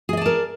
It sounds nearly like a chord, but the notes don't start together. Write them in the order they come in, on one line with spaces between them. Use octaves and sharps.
G#4 D#5 D5 A5 A#4